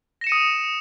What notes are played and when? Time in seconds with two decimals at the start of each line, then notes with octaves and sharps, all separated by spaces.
0.21 A#6
0.24 E7
0.27 C#7
0.29 D#7
0.32 D#6